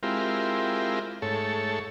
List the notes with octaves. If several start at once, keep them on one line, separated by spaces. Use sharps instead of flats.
G#3 C4 E4 F4 G4 A#4
G#2 A3 A4 C#5